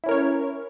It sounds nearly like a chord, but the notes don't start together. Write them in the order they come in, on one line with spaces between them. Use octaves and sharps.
E4 C#4 A#4 C#5